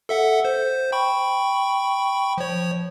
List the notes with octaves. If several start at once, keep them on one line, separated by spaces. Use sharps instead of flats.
A4 E5 F#5
C5
G5 B5 C#6
F3 C#5